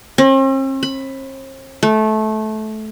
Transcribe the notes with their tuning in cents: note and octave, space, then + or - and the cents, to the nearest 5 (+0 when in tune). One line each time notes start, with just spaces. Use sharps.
C4 +45
B5 +10
A3 -20